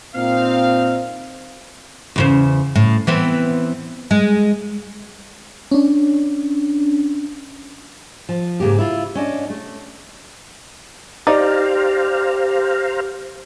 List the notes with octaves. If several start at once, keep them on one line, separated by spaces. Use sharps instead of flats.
A#2 C4 D#4 F5
E2 C#3 C5
A2
E3 B3 C4
G#3
C#4 D4
F3
G#2 C#3 A#3 G4
E4 F4
C#4 D4 D#5
A3
D#4 G4 C5 D5 F5 A#5